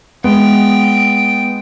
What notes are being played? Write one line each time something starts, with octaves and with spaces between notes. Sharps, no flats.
G#3 B3 G5